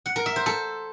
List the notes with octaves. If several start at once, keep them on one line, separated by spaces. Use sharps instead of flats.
F#5
A#4
E5
C5
A4